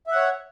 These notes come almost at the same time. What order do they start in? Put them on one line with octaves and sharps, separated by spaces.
E5 F#5 C#5